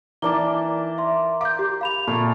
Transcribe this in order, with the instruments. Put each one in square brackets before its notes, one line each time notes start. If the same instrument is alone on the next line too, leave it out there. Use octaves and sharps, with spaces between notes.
[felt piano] E3 [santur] A#3 D5 A5 [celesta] D#4 G7
[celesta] E5 C6
[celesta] F5 G6 [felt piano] D6
[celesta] G4
F5 B5 F7
[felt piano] A#2 [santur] A3